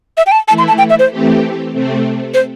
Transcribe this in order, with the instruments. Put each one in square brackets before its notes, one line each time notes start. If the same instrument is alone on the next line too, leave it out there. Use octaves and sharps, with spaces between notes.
[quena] E5
G5
A5
[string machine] E3 A3 E4 [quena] A5
[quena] C6
A5
G5
E5
C5
[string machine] E3 A3 C4 G4
C3 A3 C4
[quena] C5